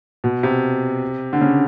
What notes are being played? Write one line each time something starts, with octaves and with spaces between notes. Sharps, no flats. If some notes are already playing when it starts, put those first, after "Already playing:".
B2
C3
D3
C#3